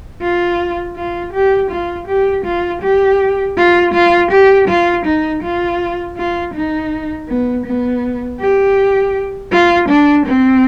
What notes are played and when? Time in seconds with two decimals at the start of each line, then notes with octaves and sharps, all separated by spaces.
0.21 F4
0.96 F4
1.33 G4
1.71 F4
2.08 G4
2.45 F4
2.82 G4
3.57 F4
3.94 F4
4.31 G4
4.68 F4
5.06 D#4
5.43 F4
6.17 F4
6.54 D#4
7.28 B3
7.66 B3
8.40 G4
9.52 F4
9.89 D4
10.26 C4